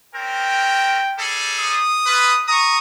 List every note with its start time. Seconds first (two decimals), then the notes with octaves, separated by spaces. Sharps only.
0.15 C4 C#4 A#4 G5
1.18 G3 G#4 A4
1.59 D#6
2.06 F4 B4
2.48 A#5 C#6 D#6